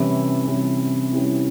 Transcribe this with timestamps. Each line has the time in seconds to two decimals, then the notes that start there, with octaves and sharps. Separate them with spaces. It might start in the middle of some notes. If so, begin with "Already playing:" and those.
Already playing: C3 E3 G3 C#4 E4
0.47 C3 E3 G3 C#4 E4
1.12 C3 E3 G3 C#4 E4